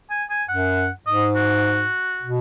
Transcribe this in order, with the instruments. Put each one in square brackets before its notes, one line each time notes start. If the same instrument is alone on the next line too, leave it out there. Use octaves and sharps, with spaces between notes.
[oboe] G#5
G#5
[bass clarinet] F#2 [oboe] F#5
[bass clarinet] G#2 [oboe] D#5
[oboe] F#4
[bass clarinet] B2